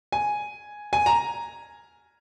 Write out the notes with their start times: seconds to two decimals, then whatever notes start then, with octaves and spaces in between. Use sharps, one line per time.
0.12 G#5
0.93 G#5
1.06 A#5